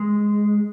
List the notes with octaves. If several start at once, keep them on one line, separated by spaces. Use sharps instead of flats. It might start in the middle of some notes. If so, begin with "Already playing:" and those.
Already playing: G#3